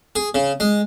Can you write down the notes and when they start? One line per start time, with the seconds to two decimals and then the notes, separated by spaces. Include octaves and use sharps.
0.16 G#4
0.35 C#3
0.60 G#3